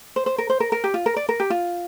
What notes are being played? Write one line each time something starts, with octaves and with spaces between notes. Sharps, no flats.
C5
C5
A#4
C5
A#4
A#4
G4
F4
A#4
D5
A#4
G4
F4